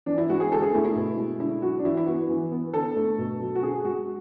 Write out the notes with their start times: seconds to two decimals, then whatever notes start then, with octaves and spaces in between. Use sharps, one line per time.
0.06 E3 D4
0.18 E4
0.30 G#3 F#4
0.40 G#4
0.52 D3 A4
0.62 G#4
0.73 A3 E4
0.85 E4
0.95 B2
1.18 G#3
1.40 D3 E4
1.62 F#3 F#4
1.79 D4
1.85 E3 E4
1.97 E4
2.06 B3 F#4
2.29 E3
2.52 B3
2.73 D3 A4
2.96 A3
3.18 B2
3.40 F#3
3.55 F#4
3.63 D3 G#4
3.85 G#3 F#4